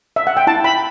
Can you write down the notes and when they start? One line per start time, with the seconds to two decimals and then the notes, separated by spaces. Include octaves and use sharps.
0.16 E5
0.27 F#5
0.37 G5
0.47 E4 A5
0.64 B5